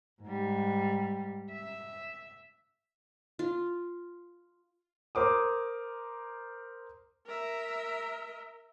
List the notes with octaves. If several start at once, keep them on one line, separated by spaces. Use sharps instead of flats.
G#2 G3
E5
F4
A#4 C5 D6 D#6
A#4 E5